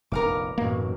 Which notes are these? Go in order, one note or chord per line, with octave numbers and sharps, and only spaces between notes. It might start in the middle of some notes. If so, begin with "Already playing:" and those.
F1 A#1 F2 B3 D#4 A#4 F5 D6
A1 F#2 B2 A#3 D7